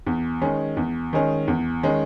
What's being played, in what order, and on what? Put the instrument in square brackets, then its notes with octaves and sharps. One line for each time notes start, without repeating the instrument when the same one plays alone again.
[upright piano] E2
D#3 G#3 C#4
E2
D#3 G#3 C#4
E2
D#3 G#3 C#4